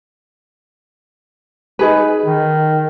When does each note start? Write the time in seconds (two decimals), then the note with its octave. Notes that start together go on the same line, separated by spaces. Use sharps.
1.79 D#4 G#4 B4
2.26 D#3